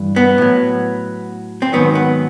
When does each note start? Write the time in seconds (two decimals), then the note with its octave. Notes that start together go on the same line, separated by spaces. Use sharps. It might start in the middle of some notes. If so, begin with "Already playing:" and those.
Already playing: G2 E3
0.16 B3
0.38 A2 F#3
1.62 C4
1.73 G#2 D#3 F#3 B3
1.95 B3